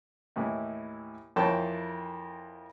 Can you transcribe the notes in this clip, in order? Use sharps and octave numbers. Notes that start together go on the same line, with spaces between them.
D#2 A2 E3
F2 E3 A#3 C#5 G5 A5